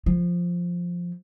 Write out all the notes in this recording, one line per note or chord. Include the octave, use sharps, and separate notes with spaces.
F3